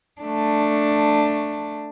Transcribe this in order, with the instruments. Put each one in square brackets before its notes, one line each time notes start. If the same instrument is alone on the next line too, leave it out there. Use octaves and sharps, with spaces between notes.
[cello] A3 D4